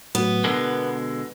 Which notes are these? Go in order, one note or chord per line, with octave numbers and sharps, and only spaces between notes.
A2 F#3 B3
B2 D3 G#3 A#4